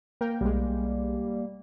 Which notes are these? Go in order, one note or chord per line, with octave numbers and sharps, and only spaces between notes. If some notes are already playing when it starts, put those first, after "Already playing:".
A#3 A#4 G5
B1 G3 G#3